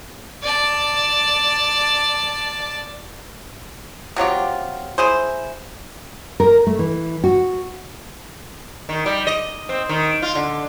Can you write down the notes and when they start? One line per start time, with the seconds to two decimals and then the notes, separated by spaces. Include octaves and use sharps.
0.43 D5 A5
4.16 C3 F#3 F4 G4
4.98 E4 G#4 C5
6.40 A#4
6.67 A3
6.79 E3
7.24 F#4
8.89 D#3
9.06 G3
9.27 D#5
9.69 C4
9.89 D#3
10.22 F4
10.35 D3